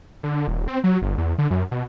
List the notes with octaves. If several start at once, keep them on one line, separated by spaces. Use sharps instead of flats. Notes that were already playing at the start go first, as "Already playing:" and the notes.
D3
D#1
C4
F#3
G1
E2
D3
F#2
B2